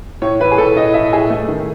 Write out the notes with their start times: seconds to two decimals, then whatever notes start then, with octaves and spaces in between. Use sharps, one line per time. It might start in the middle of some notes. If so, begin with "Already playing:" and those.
0.22 A2 C#5
0.40 E3 B4
0.52 G#4
0.58 A2 A4
0.76 A2 D#5
0.94 A2 E5
1.13 A2 G#4
1.30 A3
1.48 D#3